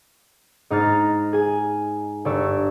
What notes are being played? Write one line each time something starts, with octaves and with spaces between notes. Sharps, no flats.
G#2 D#4 C5 A#5 F6 A6
G#4 G#5
G1 D5 C#6 E6